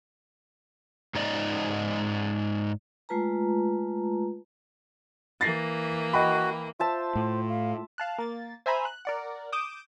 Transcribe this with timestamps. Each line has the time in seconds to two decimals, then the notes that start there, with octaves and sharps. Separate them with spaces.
1.15 G#2 D#4 D5 D#5
3.09 G#3 A3 F4 B4 A5 A#5
5.41 E3 A#3 A6 A#6 C7
6.13 F#4 D#5 G5 B5
6.79 F4 C5 E5 A5
7.16 A2
7.49 F5
7.98 F5 A5 F#6
8.19 A#3 A6
8.66 C5 E5 G#5 A#5 B5
8.85 F#6
9.05 A#4 D5 F#5
9.52 D6 D#6 G6 D7 E7